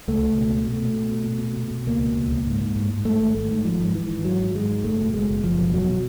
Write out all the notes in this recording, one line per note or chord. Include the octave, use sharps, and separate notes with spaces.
C#2 A3
C#2
B2
B2
B2 A3
B2
B2
B2
B2
B2
B2
B2
C#2 A#3
B2
C#2
C#2
G#2
G#2
G#2
G#2
G#2 A3
G#1
G#1 A3
G#2
G#1 F3
G#2
G#2 E3
G#1
G#2 F#3
G#1
G#2 G#3
G#2
F#1 A3
B2
F#1 G#3
F#1
F#1 F3
B2
E2 F#3
B2